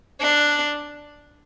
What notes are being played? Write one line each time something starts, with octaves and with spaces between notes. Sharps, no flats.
D4